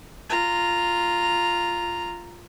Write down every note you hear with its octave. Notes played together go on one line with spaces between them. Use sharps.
F4 A#5